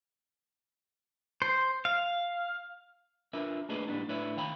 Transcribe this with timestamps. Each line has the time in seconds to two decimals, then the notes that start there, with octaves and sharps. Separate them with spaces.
1.42 C5
1.85 F5
3.33 D4 F4 A#4 B4 E5
3.69 A3 A#3 D4 D#4 G#4 B4
3.88 A2 G3 A#3 B3 D4
4.08 A2 D4 B4 C#5 E5
4.37 D#3 F5 G5 B5